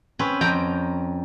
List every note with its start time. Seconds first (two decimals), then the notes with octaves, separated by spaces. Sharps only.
0.19 C4 C#4 B4
0.41 F2 G5 A#5